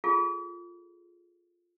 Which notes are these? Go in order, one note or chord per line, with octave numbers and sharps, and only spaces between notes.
F4 G#4 A4